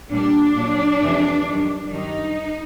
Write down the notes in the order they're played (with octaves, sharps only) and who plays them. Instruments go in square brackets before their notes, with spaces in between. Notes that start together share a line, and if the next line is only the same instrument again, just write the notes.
[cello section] A#2 G3 D4
A#2 F#3
F2 C3 E3 G#3
F#2 D#3 G3
F#2 D#3 G3 D#4